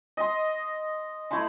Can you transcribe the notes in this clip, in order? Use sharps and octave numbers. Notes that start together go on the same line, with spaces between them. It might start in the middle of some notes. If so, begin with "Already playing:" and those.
D#5 C6
A3 E4 B5 C6